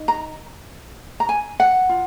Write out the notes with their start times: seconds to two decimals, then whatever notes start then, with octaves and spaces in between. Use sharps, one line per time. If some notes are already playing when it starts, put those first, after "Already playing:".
Already playing: D#4
0.08 A#5
1.20 A#5
1.29 G#5
1.60 F#5
1.89 F4